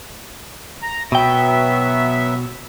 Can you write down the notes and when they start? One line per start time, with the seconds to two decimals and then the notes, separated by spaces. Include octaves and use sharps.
0.82 A#5
1.12 B2 F#3 B3 E5 G5